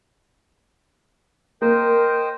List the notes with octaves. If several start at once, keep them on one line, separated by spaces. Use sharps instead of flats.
A#3 A#4 C5 D#5 G5